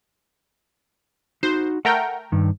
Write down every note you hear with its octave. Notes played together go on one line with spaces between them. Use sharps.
D#4 F#4 C5
A3 A#4 F#5 G5
G2 D#3